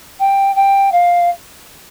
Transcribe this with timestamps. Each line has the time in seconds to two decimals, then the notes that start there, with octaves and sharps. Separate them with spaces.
0.19 G5
0.55 G5
0.91 F5